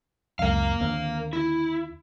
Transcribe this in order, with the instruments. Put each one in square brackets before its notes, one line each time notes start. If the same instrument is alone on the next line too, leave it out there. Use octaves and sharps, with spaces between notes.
[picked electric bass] C#2 F#2 [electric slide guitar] A#4 F5
[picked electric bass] D#2 D3 C4
[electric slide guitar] E4